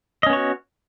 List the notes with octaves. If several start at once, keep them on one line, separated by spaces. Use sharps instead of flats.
B3 C#4 F#4 C#5 D#5